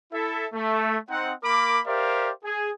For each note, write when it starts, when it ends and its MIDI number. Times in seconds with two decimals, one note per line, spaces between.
0.13 0.46 64
0.13 0.46 69
0.13 0.46 76
0.54 0.98 57
1.10 1.33 60
1.10 1.33 63
1.10 1.33 78
1.43 1.80 58
1.43 1.80 70
1.43 1.80 83
1.43 1.80 86
1.86 2.32 67
1.86 2.32 70
1.86 2.32 72
1.86 2.32 74
1.86 2.32 76
1.86 2.32 77
2.44 2.71 68